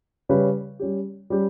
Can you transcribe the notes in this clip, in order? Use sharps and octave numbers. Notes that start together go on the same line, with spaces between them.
C#3 G3 C#4 G4 B4
G3 C#4 G4
G3 C#4 G4